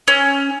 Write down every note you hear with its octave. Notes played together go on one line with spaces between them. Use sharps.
C#4